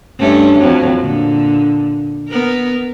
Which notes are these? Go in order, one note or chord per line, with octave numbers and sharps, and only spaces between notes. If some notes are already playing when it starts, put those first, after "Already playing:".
G2 A3 C#4
F2 F#3
A#2 D3
B3 A#4